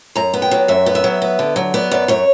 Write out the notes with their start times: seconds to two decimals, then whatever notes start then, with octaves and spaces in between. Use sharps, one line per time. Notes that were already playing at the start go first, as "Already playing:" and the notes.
0.15 F#2 A#5
0.33 B3
0.42 G5
0.51 F#3
0.68 F#2 E5
0.86 B3
0.95 E5
1.04 F#3
1.22 B3
1.39 D3
1.56 F#3
1.74 B3 D5
1.91 F#2 D5
2.08 F#2 C#5